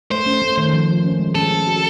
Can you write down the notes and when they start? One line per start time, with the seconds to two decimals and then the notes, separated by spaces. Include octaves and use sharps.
0.11 A3 C5
0.26 C#4
0.42 A3
0.58 D#3
0.73 F3
0.89 F3
1.04 C#4
1.19 G#3
1.35 C#4 A4
1.51 C#4
1.67 F#4